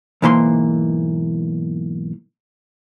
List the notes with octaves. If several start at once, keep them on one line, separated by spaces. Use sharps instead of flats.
B1 G#2 E3 A#3 B5 C6